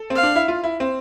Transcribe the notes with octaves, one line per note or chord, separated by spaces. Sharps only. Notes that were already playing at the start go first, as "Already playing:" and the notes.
Already playing: A4
C4
F5
D4
E4
F4
E4
C4